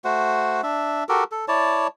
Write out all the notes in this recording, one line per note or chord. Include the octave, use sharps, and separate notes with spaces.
A3 F#4 C5 F#5
D4 E5
F#4 G4 A4 A#4
A4
E4 C#5 D5 A5